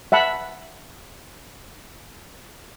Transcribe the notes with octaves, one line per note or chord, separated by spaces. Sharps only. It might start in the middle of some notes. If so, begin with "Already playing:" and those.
E5 F#5 A5 B5